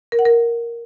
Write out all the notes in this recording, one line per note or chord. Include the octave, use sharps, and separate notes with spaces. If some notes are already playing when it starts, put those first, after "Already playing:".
A#4
F#5
A#4